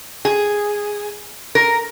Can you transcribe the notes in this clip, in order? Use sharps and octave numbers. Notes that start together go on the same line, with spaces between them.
G#4
A#4